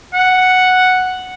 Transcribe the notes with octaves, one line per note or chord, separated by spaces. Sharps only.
F#5